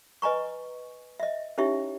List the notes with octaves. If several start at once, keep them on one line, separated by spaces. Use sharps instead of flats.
B4 D#5 G#5 A#5 C#6
D#5 E5
C#4 D#4 E4 G4 C#5 E5